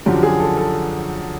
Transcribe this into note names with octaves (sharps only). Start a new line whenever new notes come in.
F#2 D3 F3 G4
G#4
A4
A4